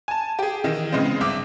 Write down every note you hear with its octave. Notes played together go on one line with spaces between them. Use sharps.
G#5 A5
G4 G#4
D#3 E3
C#3 G#3 B3 C4
G1 E5 D6